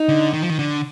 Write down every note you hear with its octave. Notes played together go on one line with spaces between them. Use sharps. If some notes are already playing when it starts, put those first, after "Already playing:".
Already playing: D#4
D3
D#3
F3
D#3
D3